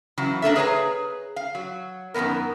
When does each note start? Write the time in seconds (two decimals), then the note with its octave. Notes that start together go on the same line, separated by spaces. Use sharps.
0.18 C#3 E3 F#3
0.42 A#3 D4 A4 E5
0.56 G#4 B4 C#5 G#5 A#5
1.36 F5
1.55 F#3
2.14 F#2 D#3 E3 B3 A#4